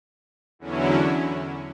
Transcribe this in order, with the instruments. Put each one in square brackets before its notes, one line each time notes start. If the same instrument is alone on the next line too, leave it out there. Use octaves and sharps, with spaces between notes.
[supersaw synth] E2 D3 F#3 C#4 E4